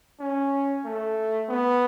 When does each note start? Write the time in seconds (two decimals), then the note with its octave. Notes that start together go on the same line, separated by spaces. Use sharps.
0.20 C#4
0.85 A3
1.49 B3